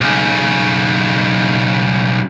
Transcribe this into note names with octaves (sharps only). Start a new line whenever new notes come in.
B1 C#3